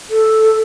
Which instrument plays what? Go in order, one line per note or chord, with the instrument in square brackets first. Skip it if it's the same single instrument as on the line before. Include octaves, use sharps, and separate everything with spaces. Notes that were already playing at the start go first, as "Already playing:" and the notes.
[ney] A4